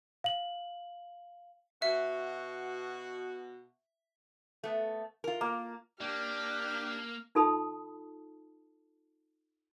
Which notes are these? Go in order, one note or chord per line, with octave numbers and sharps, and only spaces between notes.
F5 F#7
B2 F#4 E5
A3 B3
F4 A#4
A#3
A#3 D4 G4 F6
D#4 F4 A4 A5 B5 D#6